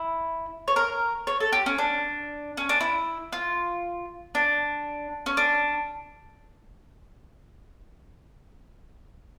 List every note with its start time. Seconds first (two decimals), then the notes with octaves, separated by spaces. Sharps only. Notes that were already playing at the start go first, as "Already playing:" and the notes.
Already playing: E4
0.68 C#5
0.76 A#4
1.27 C#5
1.40 A4
1.53 G4
1.66 C#4
1.78 D4
2.57 C#4
2.69 D4
2.81 E4
3.33 F4
4.35 D4
5.26 C#4
5.37 D4